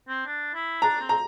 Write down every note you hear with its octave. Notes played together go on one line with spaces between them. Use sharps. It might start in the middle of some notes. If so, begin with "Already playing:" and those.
C4
D4
E4
D4 A#5
C4
A#5